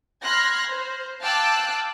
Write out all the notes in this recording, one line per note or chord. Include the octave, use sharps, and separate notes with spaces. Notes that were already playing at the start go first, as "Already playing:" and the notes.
B5 C6 F6 F#6 G#6 A#6
C5
F5 G5 A5 D6 E6 F#6